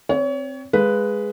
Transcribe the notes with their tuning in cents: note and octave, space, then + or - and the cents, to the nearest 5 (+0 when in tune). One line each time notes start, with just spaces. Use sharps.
C4 +0 C#5 +30
G#3 +0 B4 +0 F5 +0